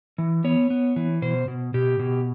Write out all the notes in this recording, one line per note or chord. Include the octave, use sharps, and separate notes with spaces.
E3
B3 C#5
B3
E3
B2 C5
B2
B2 G4
B2